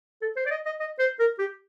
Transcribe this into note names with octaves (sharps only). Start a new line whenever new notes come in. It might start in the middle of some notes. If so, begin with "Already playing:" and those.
A4
C5
D5
D#5
D#5
D#5
C5
A#4
G4